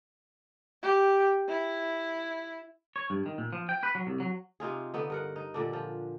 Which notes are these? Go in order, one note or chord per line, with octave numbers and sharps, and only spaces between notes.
G4
E4
C#5
G2
D#3
A#2
F3
G5
B4
F#3
C2
F#3
C3 D#4 F4 G#4
D3 B3 D#4
G2 A#4 F#5
D#4
A#2 D3 D4
F3